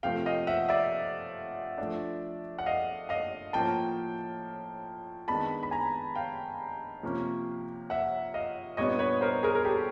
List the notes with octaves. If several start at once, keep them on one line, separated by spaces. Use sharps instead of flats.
C3 F3 A3 C4 F5 G5
D#5 F5
E5 F#5
D5 E5
F3 A3 D4
F#5
D#5 F5
D#5 F5
A2 F3 A#3 C#4 G5 A5
D#3 G#3 B3 D4 A5 B5
B5
G#5 A#5
F5 G5
C3 F3 A#3 C#4
E5 F#5
D#5 F5
A#2 G3 B3 D4 C#5 D#5
B4 C#5
A#4 C5
G#4 A#4
A#4
G4 A4